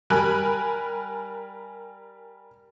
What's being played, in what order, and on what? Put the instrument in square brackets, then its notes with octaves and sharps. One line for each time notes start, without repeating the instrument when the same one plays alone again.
[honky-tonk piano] G3 A#4 G#5 B5 F#6